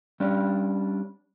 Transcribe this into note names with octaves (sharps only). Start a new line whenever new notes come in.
G3 C#4 D4